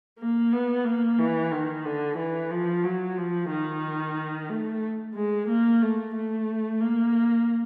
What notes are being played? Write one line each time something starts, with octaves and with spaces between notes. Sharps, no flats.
A#3
B3
A#3
E3
D#3
D3
E3
F3
F#3
F3
D#3
A3
G#3
A#3
A3
A3
A#3